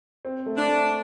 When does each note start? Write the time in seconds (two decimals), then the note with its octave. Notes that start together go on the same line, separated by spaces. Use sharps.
0.25 C4
0.46 A3
0.57 D4
0.68 A3